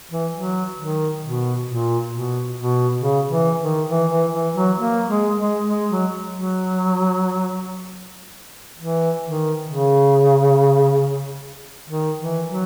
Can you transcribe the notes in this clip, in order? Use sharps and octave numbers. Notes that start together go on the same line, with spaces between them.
E3
F#3
D#3
B2
A#2
B2
B2
C#3
E3
D#3
E3
E3
E3
F#3
A#3
G#3
G#3
G#3
F#3
F#3
E3
D#3
C#3
D#3
E3
F#3